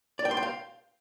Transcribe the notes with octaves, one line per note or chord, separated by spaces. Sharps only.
D5
G5
C6
G5
F5